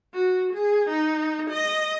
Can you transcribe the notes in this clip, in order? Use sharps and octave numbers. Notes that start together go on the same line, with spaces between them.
F#4
G#4
D#4
D#5